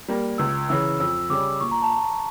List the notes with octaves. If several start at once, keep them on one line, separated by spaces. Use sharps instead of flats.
G3 A#3
C#2 E6
C#3 E3 E6
F2 E6
C#3 G3 C#4 D6
A#2 C#6
A#5
A5